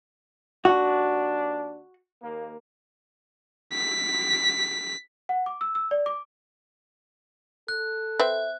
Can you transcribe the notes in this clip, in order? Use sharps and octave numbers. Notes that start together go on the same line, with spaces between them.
D#2 D4 F#4
D#2 A#3
B6
F#5
D6
E6
E6
D5
D6
A4 F#6
C4 B4 E5